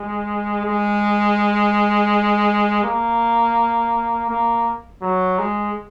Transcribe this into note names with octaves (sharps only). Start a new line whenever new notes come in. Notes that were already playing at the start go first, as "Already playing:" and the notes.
Already playing: G#3
G#3
A#3
A#3
F#3
G#3